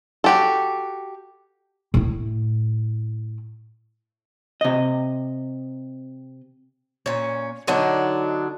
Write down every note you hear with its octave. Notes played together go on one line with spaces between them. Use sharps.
F#4 G4 A4
A2 E4
C3 D#5
A#2 C#4
D3 F#3 D4 D#4